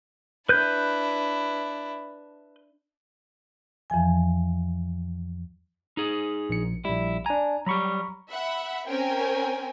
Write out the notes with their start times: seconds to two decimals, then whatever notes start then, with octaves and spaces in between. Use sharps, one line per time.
0.49 D4 E4 B4 G6
3.90 F2 E3 F3 G#5
5.97 D#4 G#4
6.49 A#1 C#7
6.85 A#1 G3 E4
7.26 D4 G#5 A#5
7.66 F#3 G3 A#5 B5 C#6
8.30 E5 F#5 B5
8.87 C4 C#4 A#4 G5 G#5